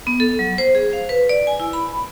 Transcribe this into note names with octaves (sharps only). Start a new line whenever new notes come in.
B3
A4
F#3
C5
G#4
F5
B4
D5
G#5
E4
B5